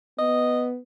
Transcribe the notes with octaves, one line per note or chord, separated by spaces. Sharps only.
B3 D#5